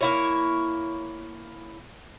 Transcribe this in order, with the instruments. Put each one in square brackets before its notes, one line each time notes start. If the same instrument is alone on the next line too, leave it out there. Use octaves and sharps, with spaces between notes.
[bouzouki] A#3 E4 C#5